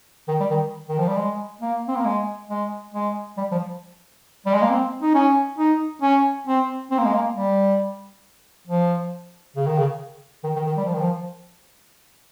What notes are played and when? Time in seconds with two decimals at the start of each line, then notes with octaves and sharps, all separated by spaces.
0.28 D#3
0.40 G3
0.50 D#3
0.89 D#3
0.99 F3
1.08 G3
1.17 G#3
1.61 A#3
1.88 C4
1.96 A#3
2.05 G#3
2.49 G#3
2.94 G#3
3.38 G3
3.52 F3
4.46 G3
4.54 G#3
4.62 A#3
4.70 C4
5.02 D#4
5.15 C#4
5.58 D#4
6.02 C#4
6.47 C4
6.91 C4
6.99 A#3
7.05 G#3
7.14 A#3
7.35 G3
8.67 F3
9.56 C#3
9.66 D#3
9.78 C#3
10.44 D#3
10.56 D#3
10.67 D#3
10.77 G3
10.85 F3
10.93 D#3
11.01 F3